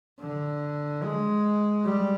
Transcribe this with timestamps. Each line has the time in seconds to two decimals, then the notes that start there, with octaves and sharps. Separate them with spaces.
0.20 D3
1.03 G#3
1.85 G3